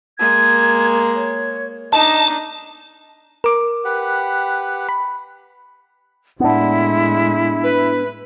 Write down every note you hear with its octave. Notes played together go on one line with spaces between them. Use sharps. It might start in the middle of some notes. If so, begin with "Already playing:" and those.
G#3 A#3 G#6
C#5
D4 D#4 D#5 A5
A#4 D6
G4 B4 F#5
B5
A2 G#3 B3 D4 E4
B4